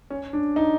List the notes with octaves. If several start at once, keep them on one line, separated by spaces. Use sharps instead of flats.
C#4
D4
D#4